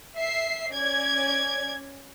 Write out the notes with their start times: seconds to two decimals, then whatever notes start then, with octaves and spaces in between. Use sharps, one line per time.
0.17 E5 C7
0.70 C#4 D5 G#6